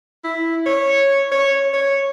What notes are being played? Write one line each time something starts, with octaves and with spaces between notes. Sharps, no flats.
E4
C#5
C#5
C#5